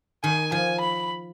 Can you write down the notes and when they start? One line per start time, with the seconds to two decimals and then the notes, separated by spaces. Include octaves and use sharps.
0.24 D#3 G#5
0.52 F3 G#5
0.80 B5